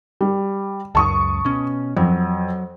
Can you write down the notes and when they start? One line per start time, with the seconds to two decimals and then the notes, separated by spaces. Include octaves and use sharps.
0.21 G3
0.95 C#2 F#2 A5 C#6 D#6
1.45 B2 C#4
1.97 F2 F#3